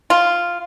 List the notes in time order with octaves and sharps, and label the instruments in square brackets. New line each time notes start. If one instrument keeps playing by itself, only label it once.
[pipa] F4